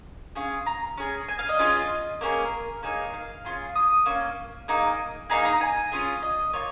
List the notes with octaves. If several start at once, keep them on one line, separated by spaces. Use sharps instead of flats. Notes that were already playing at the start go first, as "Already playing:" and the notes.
C#4 F4 G#4
A#5
C#4 G#4
G#5
F5
D#5
C#4 F4 G#4
A#3 C#4 G#4 A#4
A#3 D#4 G#4 C#5
F5
C#4 F4 G#4
D#6
A#3 C#4
A#3 D#4 G#4
A#3 D#4 G#4 A#5
A#5
G#5
C#4 F4 G#4
D#5
A#3 F4 C#5